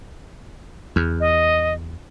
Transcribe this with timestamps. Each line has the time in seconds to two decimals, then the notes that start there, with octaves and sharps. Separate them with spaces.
0.96 E2
1.20 D#5